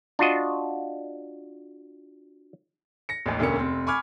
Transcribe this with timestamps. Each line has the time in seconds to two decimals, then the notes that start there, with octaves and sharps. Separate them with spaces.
0.19 D4 F4 F#4 D#5
3.09 A#6 C#7
3.26 A1 D#2
3.39 E1 D2 D3 A#3 C#4 C#7
3.58 F1 C4
3.87 G#5 B5 C#6 D6 F6 G#6